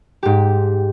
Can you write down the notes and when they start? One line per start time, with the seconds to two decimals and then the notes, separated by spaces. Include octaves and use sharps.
0.23 G#2 G4